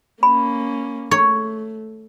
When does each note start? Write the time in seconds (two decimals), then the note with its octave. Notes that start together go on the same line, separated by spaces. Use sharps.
0.23 A#3 C#4 B5
1.11 A3 C#5